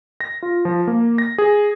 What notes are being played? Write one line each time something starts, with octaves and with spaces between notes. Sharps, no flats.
A#6
F4
F3
A#3
A#6
G#4